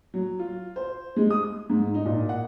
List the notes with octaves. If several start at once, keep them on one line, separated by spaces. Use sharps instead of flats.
F#3
F4
C5
G#3
D#6
G#2
D#4
A#2
F#5